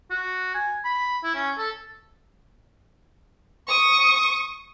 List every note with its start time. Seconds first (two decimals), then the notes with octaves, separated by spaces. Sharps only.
0.10 F#4
0.54 G#5
0.85 B5
1.23 E4
1.35 C#4
1.58 A4
3.68 C#6 D#6